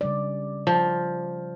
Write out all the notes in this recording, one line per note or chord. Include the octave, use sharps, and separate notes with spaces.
C#3 G3 D5
F3